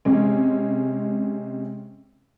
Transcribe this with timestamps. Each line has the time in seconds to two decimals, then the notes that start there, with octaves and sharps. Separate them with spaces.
0.05 C3 G#3 C#4